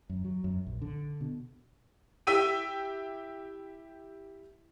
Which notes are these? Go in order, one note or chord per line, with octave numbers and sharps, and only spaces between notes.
F#2
F#3
F#2
A#1
D3
B2
E4 G4 G5 E6 B6 D#7